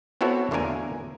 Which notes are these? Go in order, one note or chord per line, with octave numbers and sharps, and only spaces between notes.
B3 C4 E4 F#4 A4 C#5
E2 D3 A3 A#3 A#4 G#5